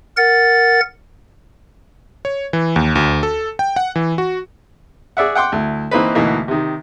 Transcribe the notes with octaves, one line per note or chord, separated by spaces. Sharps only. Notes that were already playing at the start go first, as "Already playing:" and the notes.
A#4 F#5 A6
C#5
E3
D#2
D2
A4
G5
F#5
E3
F#4
G#4 D5 E5 F#5
F#5 G5 C6 D6
D2 E4
E3 A#3 C4 D#4 B4
D2 B2 E3 A#3 D#4
C3 D#3